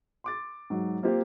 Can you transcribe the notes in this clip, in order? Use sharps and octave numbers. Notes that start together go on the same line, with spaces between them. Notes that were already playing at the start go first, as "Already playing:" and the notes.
C6 D6 A6
G#2 F#3
A#3 C4 F4 G4 C5